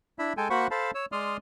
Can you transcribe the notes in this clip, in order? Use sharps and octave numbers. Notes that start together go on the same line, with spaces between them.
D4 E4 E5 B5
G#3 A4 G5 G#5
A#3 F#4 C5 F#5 B5 C#6
A4 C5 F5 A5 B5
C#5 E6
G#3 D5 C6 D#6 F6